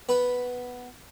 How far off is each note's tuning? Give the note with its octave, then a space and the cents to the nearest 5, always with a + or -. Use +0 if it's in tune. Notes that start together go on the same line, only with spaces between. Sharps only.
B3 +0 B4 +0